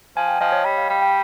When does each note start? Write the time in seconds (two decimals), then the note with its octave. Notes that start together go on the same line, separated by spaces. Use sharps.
0.17 F3 G#5
0.28 G5
0.41 F3 D#5
0.52 C#5
0.64 G3 D#5
0.78 F5
0.89 G3 G5
1.02 G5